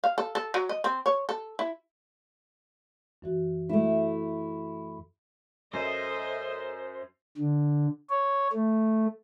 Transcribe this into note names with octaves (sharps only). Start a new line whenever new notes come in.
F5
A4
A4
F#3
D#5
C4
C#5
A4
E4
F#2 E3 F#4
A3 E4
F#2 A4 C5 D#5 E5
D3
C#5
A3